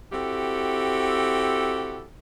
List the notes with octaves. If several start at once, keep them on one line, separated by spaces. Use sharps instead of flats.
C4 E4 F#4 G4 A4